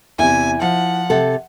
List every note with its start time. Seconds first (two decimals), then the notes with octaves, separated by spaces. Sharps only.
0.19 E2 C3 E4 G#5
0.61 F3 F#5
1.10 C3 A4